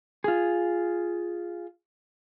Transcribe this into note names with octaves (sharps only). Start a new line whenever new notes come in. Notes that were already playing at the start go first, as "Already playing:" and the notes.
F4 G#4